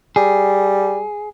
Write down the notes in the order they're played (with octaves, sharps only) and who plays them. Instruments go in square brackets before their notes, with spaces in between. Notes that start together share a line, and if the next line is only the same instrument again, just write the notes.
[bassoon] G3 [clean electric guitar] G#4